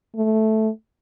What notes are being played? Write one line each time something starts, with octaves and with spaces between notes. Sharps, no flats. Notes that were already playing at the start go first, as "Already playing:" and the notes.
A3